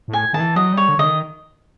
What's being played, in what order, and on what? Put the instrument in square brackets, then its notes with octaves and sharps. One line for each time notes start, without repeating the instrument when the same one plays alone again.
[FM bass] A2
[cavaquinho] G#5
[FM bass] D#3 [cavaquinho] A5
[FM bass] E3
[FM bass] F#3 [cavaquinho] D#5
[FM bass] G3 [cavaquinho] C#5
[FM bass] D3
[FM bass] D3 [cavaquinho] D#5
[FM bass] D#3